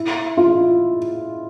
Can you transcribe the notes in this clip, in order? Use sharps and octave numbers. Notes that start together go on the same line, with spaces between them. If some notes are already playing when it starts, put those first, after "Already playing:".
Already playing: E4
F4